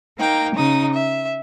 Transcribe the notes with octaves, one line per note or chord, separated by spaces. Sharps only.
A#3 D#4 G5
C#3 D#4 D#6
E5